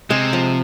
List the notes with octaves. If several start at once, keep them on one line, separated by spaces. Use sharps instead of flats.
C3 G#3
F3